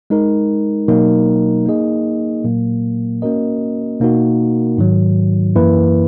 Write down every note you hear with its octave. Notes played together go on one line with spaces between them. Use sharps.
G#3 D#4 A#4
B2 F#3 A#3 D#4 A#4
A#3 D#4 G#4 D#5
A#2 F#3 A#3
A#3 C#4 F#4 A#4 D#5
B2 A#3 D#4 F#4 A#4
G#2 D#3 F#3
F#2 E3 A#3 E4 B4